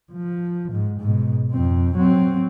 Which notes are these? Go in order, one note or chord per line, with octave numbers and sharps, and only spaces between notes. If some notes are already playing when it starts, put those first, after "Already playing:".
F3
G#2
G#2 B2
F2 C4
F#3 C4